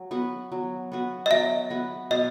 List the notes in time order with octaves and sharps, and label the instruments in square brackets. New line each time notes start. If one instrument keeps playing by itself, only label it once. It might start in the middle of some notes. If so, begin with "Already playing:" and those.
Already playing: [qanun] F#3
B3 F#4 B4
F#3
B3 F#4 B4
[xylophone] D#5
[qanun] F#3 [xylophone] E5
[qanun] B3 F#4 B4
[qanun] B2 [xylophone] D#5